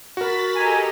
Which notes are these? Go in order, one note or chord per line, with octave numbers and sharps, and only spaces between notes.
F#4 A#4 B5 A6 B6
G4 A4 D#5 G#5 A#5